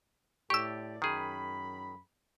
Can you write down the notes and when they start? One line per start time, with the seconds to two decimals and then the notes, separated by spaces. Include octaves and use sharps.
0.50 A2 G4 A4 D5 C#6 E6
1.02 F#2 D#3 G#4 B5